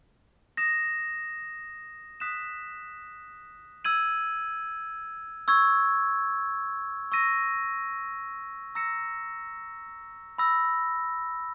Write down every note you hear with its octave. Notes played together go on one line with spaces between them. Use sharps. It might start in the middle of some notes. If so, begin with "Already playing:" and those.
D#6 A#6 E7
D#6 F#6 B6 E7
E6 G#6 D#7 F#7
C#6 E6 G#6
C#6 E6 A#6 D#7
A#5 E6 A#6 C#7 E7
B5 E6 A#6